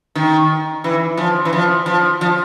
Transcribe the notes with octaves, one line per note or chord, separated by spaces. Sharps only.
D#3
E3
F3
E3
F3
F3
F3